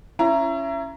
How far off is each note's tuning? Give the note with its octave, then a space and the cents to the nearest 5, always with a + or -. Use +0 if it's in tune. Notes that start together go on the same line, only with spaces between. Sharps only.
C#4 +0 E4 +30 A#5 +0